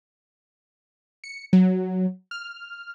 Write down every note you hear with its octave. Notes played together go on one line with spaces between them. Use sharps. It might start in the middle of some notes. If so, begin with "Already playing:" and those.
C#7
F#3
F6